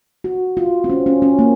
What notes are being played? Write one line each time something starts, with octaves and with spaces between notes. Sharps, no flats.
F#4
F4
C4
C#4
C#4
C#4
A#3